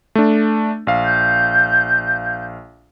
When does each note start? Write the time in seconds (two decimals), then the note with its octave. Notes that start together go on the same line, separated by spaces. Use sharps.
0.15 A3 D4
0.87 A#1 F5
1.04 G6